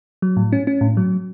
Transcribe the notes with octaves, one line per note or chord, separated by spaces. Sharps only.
F#3
A2
C#4
C#4
A2
F#3